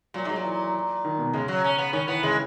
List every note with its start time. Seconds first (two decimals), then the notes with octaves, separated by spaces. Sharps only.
0.14 A#2 F#3
0.25 G#2 F#3
0.36 A#2
0.45 E3
1.05 D#3
1.19 B2
1.33 C#3 G#3
1.48 F#3
1.64 C#4
1.78 B3
1.93 D#3 C#4
2.08 E3 B3
2.23 C#3 G#3